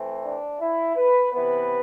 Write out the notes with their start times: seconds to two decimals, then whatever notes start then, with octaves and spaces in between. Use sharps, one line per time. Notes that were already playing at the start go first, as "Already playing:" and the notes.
Already playing: E3 A3 C4
0.23 D4
0.60 E4
0.96 B4
1.33 C3 E3 B3 B4